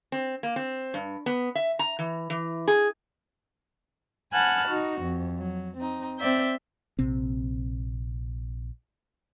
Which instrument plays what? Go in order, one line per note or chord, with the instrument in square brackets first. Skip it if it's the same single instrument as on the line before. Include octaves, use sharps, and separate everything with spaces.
[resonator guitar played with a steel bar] C4
A#3
C4
G2
B3
E5
A#5
E3
E3
G#4
[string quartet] F#5 G#5 A5 B5 F6 F#6
D#4 F#4
F2
F#3
C4 D#4
C4 D5 E5 G6
[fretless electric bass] A#1 C3 C4